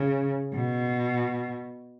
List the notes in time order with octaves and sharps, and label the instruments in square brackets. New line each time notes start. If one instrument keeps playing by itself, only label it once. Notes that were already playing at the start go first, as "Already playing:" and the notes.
Already playing: [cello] C#3
B2